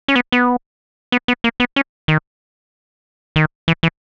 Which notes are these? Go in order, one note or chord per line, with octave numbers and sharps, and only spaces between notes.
C#4
B3
B3
B3
B3
A#3
B3
C#4
D#3
D#3
E3
E3